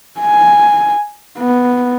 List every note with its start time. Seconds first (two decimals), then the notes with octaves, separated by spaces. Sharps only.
0.20 G#5
1.39 B3